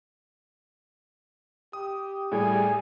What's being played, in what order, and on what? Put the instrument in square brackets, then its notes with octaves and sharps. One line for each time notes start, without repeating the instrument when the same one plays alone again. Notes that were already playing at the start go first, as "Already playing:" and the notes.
[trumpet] G4 [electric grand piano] D#6
[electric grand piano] A2 [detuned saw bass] G3 [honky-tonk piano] G#4 [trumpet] G#5